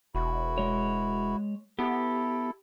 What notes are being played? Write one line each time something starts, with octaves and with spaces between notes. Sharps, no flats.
E1 E4 F#4
G#3 C#5
B3 E4 G4 A4